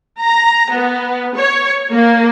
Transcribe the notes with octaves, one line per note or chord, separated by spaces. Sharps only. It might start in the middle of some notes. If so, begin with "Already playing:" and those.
A#5
B3
C#5
A#3